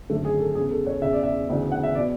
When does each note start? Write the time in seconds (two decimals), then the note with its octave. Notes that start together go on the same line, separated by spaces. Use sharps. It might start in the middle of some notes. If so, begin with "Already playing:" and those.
0.10 G#1 F#2 D3 A3
0.25 G#4
0.40 A4
0.55 E1 E2 C#3 G#4
0.71 A4
0.87 C#5
1.02 E1 E2 C#3 E5
1.13 D5
1.23 E5
1.49 E1 D2 C#3 E3
1.72 F#5
1.83 E5
1.95 B2 D5